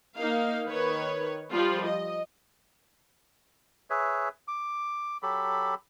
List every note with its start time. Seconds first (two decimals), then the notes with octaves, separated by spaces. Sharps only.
0.18 A#3 D#4 F5
0.66 D#3 B4 C#5
1.52 F3 G3 F4
1.84 D#5
3.90 G#4 B4 C#5 E5
4.48 D6
5.23 F#3 G4 A4 B5